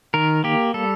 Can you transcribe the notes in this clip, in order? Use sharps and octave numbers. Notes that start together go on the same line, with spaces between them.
D#3 A#4
A#3 G4
G3 A4